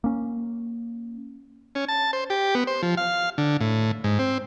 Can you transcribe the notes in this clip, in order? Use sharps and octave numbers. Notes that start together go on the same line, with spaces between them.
A#3 C#4
C#4
A5
C5
G4
B3
C5
F3
F5
D3
A2
G#2
C4